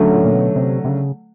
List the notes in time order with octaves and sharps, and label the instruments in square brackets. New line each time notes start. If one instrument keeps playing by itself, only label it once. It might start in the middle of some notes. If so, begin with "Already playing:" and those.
Already playing: [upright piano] D3 F#3 A3 C#4
[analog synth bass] A#2
A#2
B2
C3
C3
C#3